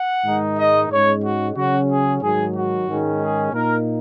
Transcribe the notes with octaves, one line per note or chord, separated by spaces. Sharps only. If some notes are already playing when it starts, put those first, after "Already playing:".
Already playing: F#5
G#2 D#3 G#3 D#4
D#5
G#2 G#3 C#4 C#5
F#4
C#3 F#3 C#4 F#4
G#4
G#2 D#3 F#3 G#4
F#4
G#2 D#3 G#3 C#4
G#4
A#2 A#3 D#4 A#4